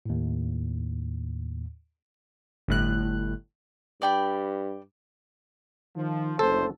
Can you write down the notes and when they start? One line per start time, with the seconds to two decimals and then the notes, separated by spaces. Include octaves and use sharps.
0.06 D#2 A2
2.68 G1 A2 F#6
4.02 G2 D5 G5 B5
5.96 D#3 F3
6.39 F#1 D2 A4 C5